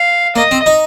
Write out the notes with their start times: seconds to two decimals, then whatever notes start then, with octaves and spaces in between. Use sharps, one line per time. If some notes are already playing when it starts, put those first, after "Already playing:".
Already playing: F5
0.36 A#3 D#5
0.51 C4
0.66 D#4